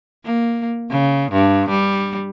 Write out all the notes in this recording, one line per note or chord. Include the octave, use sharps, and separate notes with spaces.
A#3
C#3
G2
G3